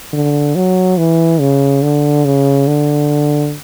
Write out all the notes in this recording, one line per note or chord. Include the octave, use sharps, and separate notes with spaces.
D3
F#3
E3
C#3
D3
C#3
D3